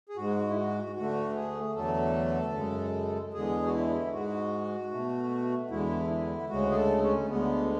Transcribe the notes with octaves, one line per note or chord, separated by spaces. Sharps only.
G#4
G#2 G#3 F#4
E4
F#4
D2 D3 A3 F#4
G#4
E2 D3 F#3 A3 A4
F#2 C#3 G#3
E2 D3 G#3 G#4
F#4
E4
G#2 G#3 F#4
B2 A3
E2 D3 G#3 E4
E4
D2 C#3 G#3 F#4
G#4
A4
C#4
D2 D3 G#3 B3